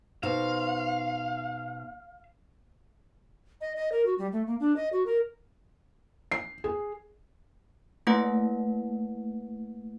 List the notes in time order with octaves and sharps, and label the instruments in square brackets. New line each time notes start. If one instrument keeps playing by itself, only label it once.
[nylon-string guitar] B2 D#4 C5 [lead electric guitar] F5
[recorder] D#5
D#5
A#4
F#4
G3
A3
A#3
D4
D#5
F#4
A#4
[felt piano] C7
G#4
[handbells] A3 A#3 E4 B4 F#5